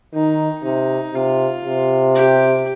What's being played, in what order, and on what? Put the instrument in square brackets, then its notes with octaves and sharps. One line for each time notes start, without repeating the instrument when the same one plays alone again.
[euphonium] D#3 [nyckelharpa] D#4
[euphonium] C3 [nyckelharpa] D#4
[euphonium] C3 [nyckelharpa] F4
[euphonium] C3
[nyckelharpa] G4